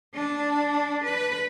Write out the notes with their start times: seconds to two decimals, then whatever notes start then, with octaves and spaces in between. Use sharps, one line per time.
0.14 D4
1.04 B4